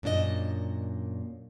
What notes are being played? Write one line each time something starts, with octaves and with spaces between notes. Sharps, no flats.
F#2 A#2 D4 F4 D#5